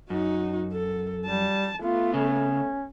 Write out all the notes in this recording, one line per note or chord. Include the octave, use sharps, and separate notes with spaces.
F#2 D#4 F#4
A4
G3 A5
A3 B3 F4
C#3 C#4